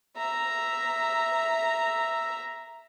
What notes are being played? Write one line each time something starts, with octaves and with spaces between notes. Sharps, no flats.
E5 A#5